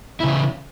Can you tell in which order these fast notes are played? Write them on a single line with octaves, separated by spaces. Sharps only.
E4 C#3 E3